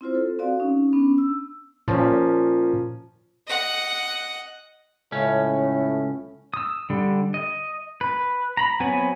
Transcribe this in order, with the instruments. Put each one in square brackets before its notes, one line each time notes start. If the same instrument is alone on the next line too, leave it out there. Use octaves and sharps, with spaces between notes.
[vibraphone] C4 E4 F4 C5
A4
C4 F#4 D5 F5
C#4 D#4
B3 C#4 D4
E6
[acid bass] A#2 [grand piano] F3 C#4
[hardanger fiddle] D#5 F#5
[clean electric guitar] C#2 C#4 [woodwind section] A2
[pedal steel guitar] D#6 E6
D3 G3
D#5
B4
A#5 B5
F#3 B3 C4 B4 G#5